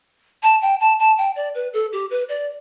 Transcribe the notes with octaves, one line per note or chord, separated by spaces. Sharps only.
A5
G5
A5
A5
G5
D5
B4
A4
G4
B4
D5